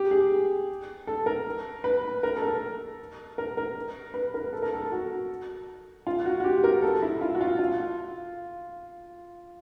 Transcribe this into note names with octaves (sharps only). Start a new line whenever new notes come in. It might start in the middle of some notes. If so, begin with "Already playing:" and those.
Already playing: G4
G#4
A4
A#4
B4
A#4
A4
A#4
A#4
A#4
B4
A#4
A4
A#4
A4
F#4
F4
F#4
F#4
G4
A#4
A4
E4
F4
F#4
F4
F4